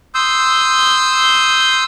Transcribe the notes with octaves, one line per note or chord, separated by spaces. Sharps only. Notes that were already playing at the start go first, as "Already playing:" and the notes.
C6 D#6 E6 G6